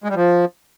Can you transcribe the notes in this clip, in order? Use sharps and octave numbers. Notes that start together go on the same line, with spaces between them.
G#3
G3
F3